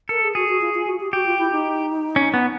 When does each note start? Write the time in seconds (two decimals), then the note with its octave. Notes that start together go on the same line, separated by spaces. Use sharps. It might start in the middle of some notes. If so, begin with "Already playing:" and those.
0.09 A4 A#4
0.23 G#4
0.35 F#4 G#4
0.48 F#4
0.61 F4
0.74 F4
0.87 F#4
1.00 G4
1.13 F#4 G4
1.26 F4
1.39 E4
1.52 D#4
2.16 C#4
2.34 B3